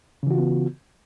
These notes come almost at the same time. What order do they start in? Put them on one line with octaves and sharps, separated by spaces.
C#3 E3 F#4 F4 B3